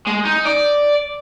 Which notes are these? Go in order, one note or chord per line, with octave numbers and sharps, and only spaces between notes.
G#3
D#4
D5